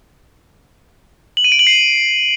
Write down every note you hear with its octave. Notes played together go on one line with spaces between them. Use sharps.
F#7
D#7
D7
F#7
C7